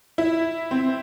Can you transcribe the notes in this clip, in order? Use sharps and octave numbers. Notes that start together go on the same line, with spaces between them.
E4
C4